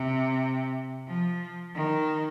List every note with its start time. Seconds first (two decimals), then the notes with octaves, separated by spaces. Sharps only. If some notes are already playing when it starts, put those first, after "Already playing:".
Already playing: C3
1.07 F3
1.75 D#3